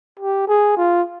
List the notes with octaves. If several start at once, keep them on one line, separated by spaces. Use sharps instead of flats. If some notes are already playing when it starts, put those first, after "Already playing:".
G4
G#4
F4